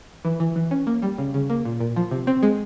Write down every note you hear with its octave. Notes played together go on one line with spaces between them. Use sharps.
E3
E3
E3
C#4
A#3
G3
C#3
C#3
A#3
A#2
A#2
F3
C3
C4
G#3